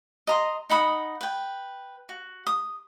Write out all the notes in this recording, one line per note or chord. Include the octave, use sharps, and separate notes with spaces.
D#5 A#5 C6
D#4 F#5 B5 D#6
B4 G5
F#4
D#6